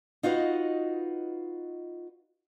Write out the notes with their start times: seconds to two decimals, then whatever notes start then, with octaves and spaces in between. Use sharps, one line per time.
0.23 D#4 F4 F#4 B4 D#5